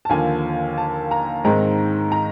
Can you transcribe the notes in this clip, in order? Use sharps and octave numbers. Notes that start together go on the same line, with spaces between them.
A5
D#2 D3 F3 A#3 G#5
A5
A#5
G#2 D#3 G#3 C4 A#5
A#5